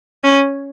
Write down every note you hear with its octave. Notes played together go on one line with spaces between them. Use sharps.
C#4